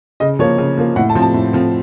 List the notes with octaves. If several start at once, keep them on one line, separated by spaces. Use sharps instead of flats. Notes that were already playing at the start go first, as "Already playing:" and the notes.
C#3 D#5
F3 A#3 C#5
C#3
F3 A#3
A2 F#5
A5
F3 C4
A5
A2
F3 C4